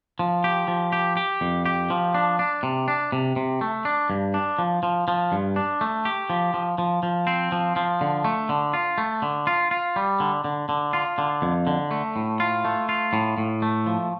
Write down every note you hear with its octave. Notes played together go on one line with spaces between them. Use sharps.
F3
G4
F3
G4
G4
F2
G4
F3
D4
D4
C3
D4
C3
C3
A3
D4
G2
D4
F3
F3
F3
G2
D4
A3
G4
F3
F3
F3
F3
C4
F3
F3
D3
A3
D3
F4
A3
D3
F4
F4
G3
D3
D3
D3
F4
D3
F2
D3
A3
A2
F4
A3
F4
A2
A2
A3
F3